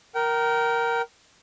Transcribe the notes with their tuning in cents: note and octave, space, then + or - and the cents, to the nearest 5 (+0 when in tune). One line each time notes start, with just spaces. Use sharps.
A#4 +5 G5 -30